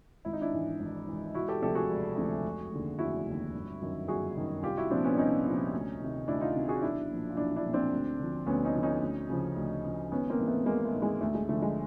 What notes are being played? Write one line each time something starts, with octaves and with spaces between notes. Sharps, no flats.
G#1 E4
D#4
D4 E4
G#2 E3
G#1
G#2 E3
E1 E4 F#4
G4 A4
D2 C3 F3 G4 A4
F#4 G#4
E1
D2 C3 F3
F1
D#2 D3
F1 E4 F#4
D#2 D3
G1
F#2 D#3
G1 F#4 G#4
F#2 D#3
C2 F4 G4
E4 F#4
A#2 F3 C4 D4
B3 C#4
D4
C2 C#4 D#4
A#2 F3
D2
C3 D#3
D2 D4 E4
D#4 F4
C3 D#3
F#4 G#4
B1 D4 E4
A#2 F3
F4
B1 D4 E4
D4 E4
A#2 F3
C4 D4
D2
D3 F3
D2 B3 C#4
C#4 D#4
D3 F3
C#4 D#4
D2
C#3 F3
D2
C#3 F3
G#1 B3 C#4
A#3 C4
G#2 E3
A3 B3
G#1 G#3 A#3
A3
G#2 E3
G#3
D2 A3
G#3
D3 F3 A3
G#3